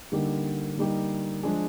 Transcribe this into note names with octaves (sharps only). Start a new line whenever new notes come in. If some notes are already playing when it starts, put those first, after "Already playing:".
D3 G3 A#3 D#4 G4
D3 G3 A#3 D#4 G4
F3 G#3 D4 G#4